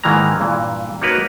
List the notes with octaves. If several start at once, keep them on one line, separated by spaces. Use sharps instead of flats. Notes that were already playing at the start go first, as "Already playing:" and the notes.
G#2 D#3 E3 G#3 A#3 A#5
G2 A#2 E3
A#3 D#4 F#4 A#4 B4 C#5